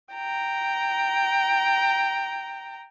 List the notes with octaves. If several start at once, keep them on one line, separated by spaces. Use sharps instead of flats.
G5 A#5